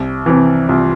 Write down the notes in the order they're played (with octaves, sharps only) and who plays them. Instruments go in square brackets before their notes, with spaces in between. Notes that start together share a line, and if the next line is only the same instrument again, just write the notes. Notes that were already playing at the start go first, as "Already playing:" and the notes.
Already playing: [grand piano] C2
C3 E3
[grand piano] C2 [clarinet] F4